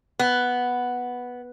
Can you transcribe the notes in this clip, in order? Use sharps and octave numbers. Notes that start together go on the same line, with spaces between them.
B3